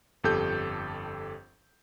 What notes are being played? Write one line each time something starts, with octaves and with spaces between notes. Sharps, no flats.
G1 F2 G4 A4 G6